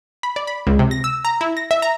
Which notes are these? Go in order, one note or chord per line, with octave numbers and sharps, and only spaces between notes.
B5
D5
B5
C#2
C3
A#6
E6
A#5
E4
A#6
E5
A#5